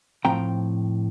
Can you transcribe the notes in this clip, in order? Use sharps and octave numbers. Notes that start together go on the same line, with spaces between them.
A2 F3 C4 G5 A#5